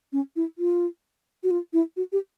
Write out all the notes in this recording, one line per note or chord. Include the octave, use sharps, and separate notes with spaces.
C#4
E4
F4
F#4
F4
E4
F#4
G4